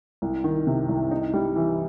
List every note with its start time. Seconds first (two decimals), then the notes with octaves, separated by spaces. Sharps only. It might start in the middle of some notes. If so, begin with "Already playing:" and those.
0.22 C2
0.44 D#3
0.67 C3
0.89 C2
1.11 D#4
1.34 G3
1.56 E3